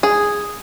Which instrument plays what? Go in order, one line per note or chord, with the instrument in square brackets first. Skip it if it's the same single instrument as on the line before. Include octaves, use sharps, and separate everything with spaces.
[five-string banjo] G#4